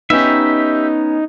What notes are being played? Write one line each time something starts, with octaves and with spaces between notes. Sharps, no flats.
B3 C#4 D#4 G4 E5